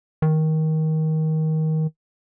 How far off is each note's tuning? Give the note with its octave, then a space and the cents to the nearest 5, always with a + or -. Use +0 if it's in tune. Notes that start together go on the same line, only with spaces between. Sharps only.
D#3 +20